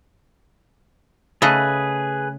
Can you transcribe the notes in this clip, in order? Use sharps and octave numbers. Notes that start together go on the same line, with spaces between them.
C#3 A3 G#4 B4 D#5